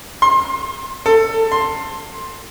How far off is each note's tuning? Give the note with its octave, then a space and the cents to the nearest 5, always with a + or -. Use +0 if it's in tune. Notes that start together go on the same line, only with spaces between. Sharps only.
C6 +30
A4 +20
C6 +10